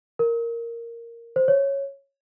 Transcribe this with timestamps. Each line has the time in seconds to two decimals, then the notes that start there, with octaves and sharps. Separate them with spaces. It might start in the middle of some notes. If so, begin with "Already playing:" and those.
0.19 A#4
1.36 C5
1.48 C#5